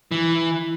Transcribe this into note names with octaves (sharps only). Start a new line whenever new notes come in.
E3